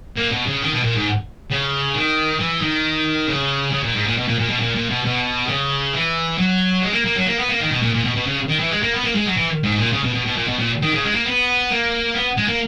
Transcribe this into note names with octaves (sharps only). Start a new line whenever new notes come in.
A#2
B2
C#3
D#3
B2
A#2
G#2
C#3
D#3
E3
D#3
C#3
C#3
A#2
G#2
A#2
B2
A#2
A#2
B2
A#2
A#2
B2
B2
D#3
C#3
E3
F#3
G#3
A#3
A#3
F#3
A#3
B3
A#3
D#3
B2
A#2
A#2
B2
B2
C#3
D#3
E3
G#3
A#3
B3
A#3
G#3
F#3
E3
G#2
A#2
C#3
B2
B2
B2
A#2
B2
A#2
D#3
C#3
G#3
A#3
B3
A#3
B3
G#3
A#3